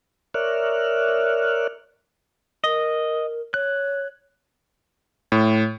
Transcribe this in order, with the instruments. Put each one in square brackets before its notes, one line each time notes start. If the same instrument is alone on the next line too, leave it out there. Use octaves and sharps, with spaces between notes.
[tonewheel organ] A#4 C#5 D5 E5 F6 F#6
[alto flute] A#4 [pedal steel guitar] D#5
[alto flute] C#5 [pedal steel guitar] F#6
[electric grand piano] A2